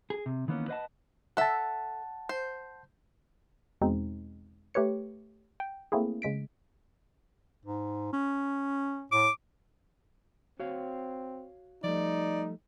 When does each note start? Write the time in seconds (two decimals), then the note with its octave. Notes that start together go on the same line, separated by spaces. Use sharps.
0.10 G#4
0.26 C3
0.48 D#3 E3 A#3 B3 C#4
0.68 B4 C5 D#5 F5 F#5 A5
1.37 A4 E5 F#5 A5
2.29 C5
3.81 E2 B2 G#3 C4 D#4
4.74 A3 G4 B4 C#5 C#7
5.60 G5
5.92 A3 A#3 C4 E4 G#4
6.22 C#3 G#3 B6 D7
7.66 G#2
8.13 C#4
9.12 A2 D6
10.60 C4 F#4 C#5 F5
11.84 F3 G3 A3 D#4 D5